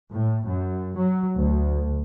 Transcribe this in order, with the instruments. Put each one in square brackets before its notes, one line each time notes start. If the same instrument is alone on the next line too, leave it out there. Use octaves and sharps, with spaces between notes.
[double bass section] A2
F#2
F#3
D2